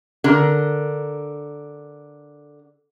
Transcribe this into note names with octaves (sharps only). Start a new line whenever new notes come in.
D3 A#4